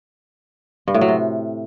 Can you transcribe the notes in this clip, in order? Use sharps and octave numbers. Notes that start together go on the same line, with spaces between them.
G2
A2
F#3
C3